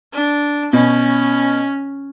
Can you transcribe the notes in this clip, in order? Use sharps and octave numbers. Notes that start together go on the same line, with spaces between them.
D4
B2 C#4